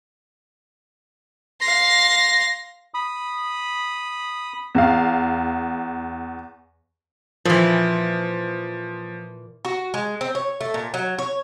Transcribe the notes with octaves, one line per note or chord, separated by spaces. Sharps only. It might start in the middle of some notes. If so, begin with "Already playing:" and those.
F5 C6 A#6
B5 D#6
E2 F5
A#2 E3 F3
F#4
G#3
C4
C#5
A3
A#2
F#3
C#5